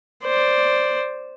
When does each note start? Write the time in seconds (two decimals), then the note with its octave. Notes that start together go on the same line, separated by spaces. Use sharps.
0.23 C5 D5